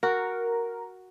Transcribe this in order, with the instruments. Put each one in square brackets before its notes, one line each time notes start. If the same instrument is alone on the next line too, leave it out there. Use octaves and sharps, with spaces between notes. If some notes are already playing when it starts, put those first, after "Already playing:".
[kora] F#4 [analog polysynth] A#4